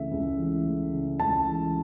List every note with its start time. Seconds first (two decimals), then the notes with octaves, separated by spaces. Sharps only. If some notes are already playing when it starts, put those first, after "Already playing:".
Already playing: C#2 C#3 E3 A3 E5
0.11 C#2
0.38 E3
0.66 A3
0.93 C#3
1.20 C#2 A5
1.47 E3